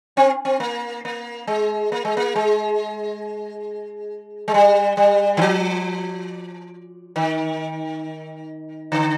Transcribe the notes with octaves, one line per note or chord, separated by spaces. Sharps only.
C4
C4
A#3
A#3
G#3
A#3
G#3
A#3
G#3
G#3
G3
G3
D#3
F3
D#3
D3